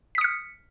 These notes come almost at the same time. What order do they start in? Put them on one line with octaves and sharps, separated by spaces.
B6 D#6 C#7 F6